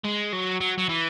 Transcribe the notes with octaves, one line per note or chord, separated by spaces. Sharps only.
G#3
F#3
F#3
F#3
E3